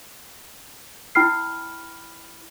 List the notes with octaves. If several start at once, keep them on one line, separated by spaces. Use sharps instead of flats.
E4 G5 B5 F6 C7